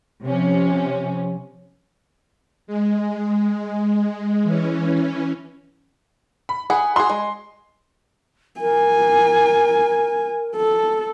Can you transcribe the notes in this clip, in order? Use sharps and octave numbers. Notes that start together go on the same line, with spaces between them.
C3 F3 C#4
G#3
E3 C#4
B5
G#4 F#5 B5
F#4 G#4 C6
G#3
A#4 G#5
A4